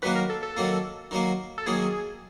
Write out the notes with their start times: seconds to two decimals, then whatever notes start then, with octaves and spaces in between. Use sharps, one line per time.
0.02 D#3 F#3 A#3 B4
0.15 A#4
0.30 A4
0.43 A4
0.57 D#3 F#3 A#3
1.11 D#3 F#3 A#3
1.58 A4
1.66 D#3 F#3 A#3 G#4